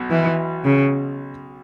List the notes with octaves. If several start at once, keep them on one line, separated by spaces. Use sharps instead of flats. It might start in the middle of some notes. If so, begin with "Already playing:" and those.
Already playing: B1 B2
E3
C#3